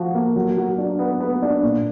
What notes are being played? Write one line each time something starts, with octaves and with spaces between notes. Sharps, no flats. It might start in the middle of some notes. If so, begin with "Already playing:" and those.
Already playing: F3 F#4
A#3
F#3
F#3
D4
B3
B3
D4
A#2